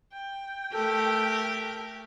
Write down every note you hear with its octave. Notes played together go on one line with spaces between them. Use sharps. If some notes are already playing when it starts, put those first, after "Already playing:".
G5
A3 G4 A4 A#4